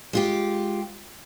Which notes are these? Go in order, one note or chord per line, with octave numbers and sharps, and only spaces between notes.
G#3 F4 G4